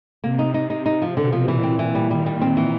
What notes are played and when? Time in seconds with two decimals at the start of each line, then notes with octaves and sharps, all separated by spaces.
0.23 C3 A#3
0.39 D#4
0.54 D#4
0.70 D#4
0.86 C3 D#4
1.02 F3
1.17 B2 D3
1.32 F3
1.48 A#2 E3
1.63 C4
1.79 E3
1.95 G3
2.11 D#3 G3
2.26 G3
2.41 C4
2.57 E3